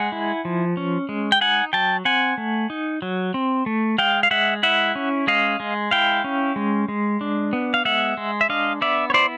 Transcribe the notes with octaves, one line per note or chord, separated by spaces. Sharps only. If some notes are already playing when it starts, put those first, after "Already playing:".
Already playing: G#3 F#5 G#5
E4
F3
C#4
G#3
G5
D#4 F#5 G#5
F#3 G5 A5
C4 F#5 G#5
A3
D#4
F#3
C4
A3
G#3 F5 G5
F5
G#3 E5 F#5
E4 E5 F#5
C#4
G#3 D#5 F5
G#3
E4 F5 G5
C#4
G#3
G#3
D4
B3
F5
G#3 E5 F#5
G#3
E5
D4 D#5 F5
B3 D5 E5
C#5
E4 C5 D5